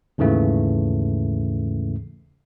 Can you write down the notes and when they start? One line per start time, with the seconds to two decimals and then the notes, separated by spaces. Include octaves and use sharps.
0.18 D#2 G#2 C#3 E3 A3